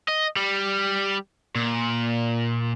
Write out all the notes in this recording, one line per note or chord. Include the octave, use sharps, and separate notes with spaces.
D#5
G3
A#2